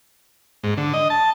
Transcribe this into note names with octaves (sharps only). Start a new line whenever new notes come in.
G#2
D3
D#5
A5